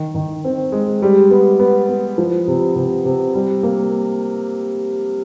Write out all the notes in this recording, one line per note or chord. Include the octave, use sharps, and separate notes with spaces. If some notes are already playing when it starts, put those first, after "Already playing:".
Already playing: D#3
D#3
C4
G#3
G3
B3
B3
B3
F3
C3
C3
C3
G3
A#3